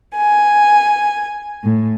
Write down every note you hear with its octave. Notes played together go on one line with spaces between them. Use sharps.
G#5
A2